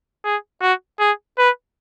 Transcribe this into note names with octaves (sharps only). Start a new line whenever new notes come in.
G#4
F#4
G#4
B4